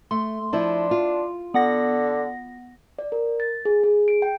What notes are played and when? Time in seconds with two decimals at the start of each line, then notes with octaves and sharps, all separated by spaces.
0.11 A3 C6
0.53 F3 D4 E4
0.91 F4
1.54 D3 B3 F#5 A#6
2.99 D5
3.12 A#4
3.40 A6
3.65 G#4
3.83 G#4
4.08 D7
4.22 G5